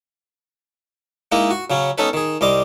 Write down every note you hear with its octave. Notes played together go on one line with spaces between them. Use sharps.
G#3 A#3 D#4 E4 D#5
F#4
C#3 F#3 C#4
B3 C#4 D#4 A4 B4
D#3 G#4
C2 G3 D#5 C6 D6